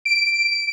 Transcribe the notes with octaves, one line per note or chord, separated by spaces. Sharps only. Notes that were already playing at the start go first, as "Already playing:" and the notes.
D7